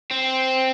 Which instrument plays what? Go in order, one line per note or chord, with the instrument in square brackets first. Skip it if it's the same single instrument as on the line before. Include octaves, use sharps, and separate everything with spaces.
[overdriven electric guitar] C4